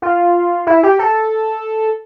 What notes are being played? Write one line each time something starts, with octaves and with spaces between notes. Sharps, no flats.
F4
E4
G4
A4